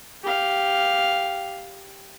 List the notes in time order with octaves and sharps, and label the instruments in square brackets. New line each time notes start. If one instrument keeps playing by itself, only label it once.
[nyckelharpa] G4 F5